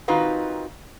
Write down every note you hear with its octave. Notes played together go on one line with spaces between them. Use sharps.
D#3 C4 D#4 F4 F#4 B4